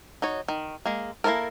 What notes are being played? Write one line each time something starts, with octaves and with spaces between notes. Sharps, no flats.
D#4 F#4 C#5
D#3
G#3 A#3
A#3 C#4 E4 A4 A#4